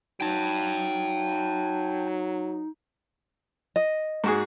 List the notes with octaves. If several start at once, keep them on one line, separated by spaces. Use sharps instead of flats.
F#3 D#4 G5 A5
D#5
G#2 F#4 G#4